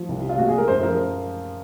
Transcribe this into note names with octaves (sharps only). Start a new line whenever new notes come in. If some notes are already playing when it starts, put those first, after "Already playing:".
Already playing: F3
C2
C3
F4
A#2 F#4
G#4
G#3 A#4
F#2 C5
F3 A#4